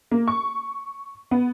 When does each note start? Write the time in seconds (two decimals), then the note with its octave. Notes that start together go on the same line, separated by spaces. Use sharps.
0.11 A#3
0.28 C#6
1.31 B3